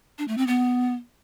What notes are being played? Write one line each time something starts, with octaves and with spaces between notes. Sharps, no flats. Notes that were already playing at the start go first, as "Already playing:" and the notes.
D4
A3
C4
B3